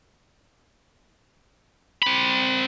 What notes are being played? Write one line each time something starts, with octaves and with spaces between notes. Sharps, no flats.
C4 B5